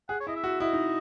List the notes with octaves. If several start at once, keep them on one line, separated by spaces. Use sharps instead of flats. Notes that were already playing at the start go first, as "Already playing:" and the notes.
G#4 F#5
C#5
E4 D#5
E5
F#4
E4 D#5
D#4